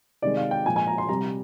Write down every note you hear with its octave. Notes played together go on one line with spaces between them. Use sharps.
C3 D#3 G#3 D5
F5
G5
A#2 F3 G#3 G#5
G#5
A#5
C6
C3 G3 A#5